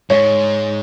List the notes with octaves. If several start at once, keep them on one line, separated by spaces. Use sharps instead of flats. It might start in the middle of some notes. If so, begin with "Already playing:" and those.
G#2 C#5